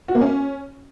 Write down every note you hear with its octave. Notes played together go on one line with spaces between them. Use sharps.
F#4
A#3
C#4